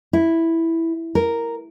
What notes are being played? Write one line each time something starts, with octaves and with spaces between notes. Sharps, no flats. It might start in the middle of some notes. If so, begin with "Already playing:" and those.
E4
A#4